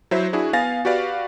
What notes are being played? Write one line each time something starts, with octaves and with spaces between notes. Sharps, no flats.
F#3 E4 C5 E5
D4 E4 F#4 G#4
B3 F5 G#5 A6 A#6
F#4 G4 B4 D5 F5